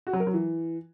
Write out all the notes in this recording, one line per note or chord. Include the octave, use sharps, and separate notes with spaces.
F#4
F#3
A#4
F#3
E3